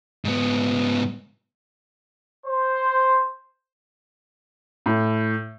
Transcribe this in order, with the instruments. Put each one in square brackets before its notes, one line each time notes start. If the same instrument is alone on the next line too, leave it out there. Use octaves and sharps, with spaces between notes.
[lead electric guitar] G#2 B3
[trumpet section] C5
[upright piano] A2